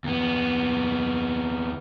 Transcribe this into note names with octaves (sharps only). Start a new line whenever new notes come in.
D#2 B3